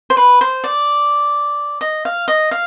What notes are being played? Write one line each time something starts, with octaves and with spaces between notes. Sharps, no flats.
C5
B4
C5
D5
D#5
F5
D#5
F5